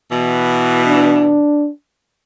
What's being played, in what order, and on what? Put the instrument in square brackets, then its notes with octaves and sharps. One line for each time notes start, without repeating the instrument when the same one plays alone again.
[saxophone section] B2 E3
[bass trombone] D4